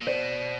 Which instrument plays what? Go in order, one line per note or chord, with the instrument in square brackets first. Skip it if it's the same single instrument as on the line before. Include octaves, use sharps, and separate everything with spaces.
[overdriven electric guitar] A#2
[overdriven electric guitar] B2 [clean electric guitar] C5 D5